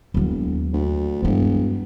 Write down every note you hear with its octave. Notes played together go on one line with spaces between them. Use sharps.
E1 D#2 F#3
D2
E1 G2 G3